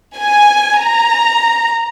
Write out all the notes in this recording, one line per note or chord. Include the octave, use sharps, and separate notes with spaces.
G#5
A#5